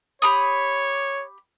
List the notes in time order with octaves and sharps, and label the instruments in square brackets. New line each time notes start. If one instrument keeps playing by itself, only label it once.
[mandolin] G4 B5 D#6 [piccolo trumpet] C#5